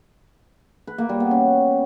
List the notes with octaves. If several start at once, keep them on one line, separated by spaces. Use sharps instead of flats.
B4
A#3
G3
B3
C#4